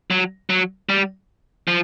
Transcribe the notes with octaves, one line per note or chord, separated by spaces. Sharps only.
F#3
F#3
G3
F3